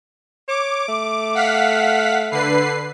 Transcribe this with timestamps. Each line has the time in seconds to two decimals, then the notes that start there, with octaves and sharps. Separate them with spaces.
0.48 C#5 D6
0.88 A3
1.35 F5 F#5 B6
2.31 D3 B4 C7